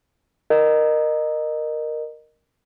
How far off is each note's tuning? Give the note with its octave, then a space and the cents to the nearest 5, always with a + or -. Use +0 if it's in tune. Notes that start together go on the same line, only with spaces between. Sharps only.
A#4 +0 D#5 -25